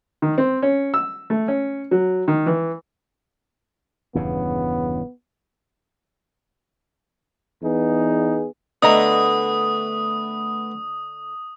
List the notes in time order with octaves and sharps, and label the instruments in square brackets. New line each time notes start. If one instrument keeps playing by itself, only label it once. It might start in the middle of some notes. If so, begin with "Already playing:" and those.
[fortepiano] D#3
C4
C#4
E6
A3
C#4
F#3
D#3
E3
[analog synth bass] D#1 [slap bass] E2 G2 C#3 [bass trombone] B3
[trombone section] E2 B3 D#4 G#4
[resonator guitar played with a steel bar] D3 D#5 A#5 [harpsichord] A3 B3 [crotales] D#6